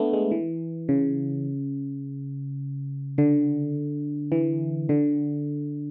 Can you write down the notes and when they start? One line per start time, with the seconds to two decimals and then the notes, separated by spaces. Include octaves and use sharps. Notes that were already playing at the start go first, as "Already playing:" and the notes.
Already playing: A3 B3 D4
0.13 G#3
0.31 E3
0.89 C#3
3.18 D3
4.32 E3
4.89 D3